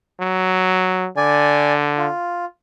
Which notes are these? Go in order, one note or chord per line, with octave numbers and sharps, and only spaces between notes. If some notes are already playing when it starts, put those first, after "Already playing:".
F#3
D3 D5 G#5
F4